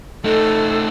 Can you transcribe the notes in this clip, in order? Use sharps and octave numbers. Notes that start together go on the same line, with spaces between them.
A3 D#4 A4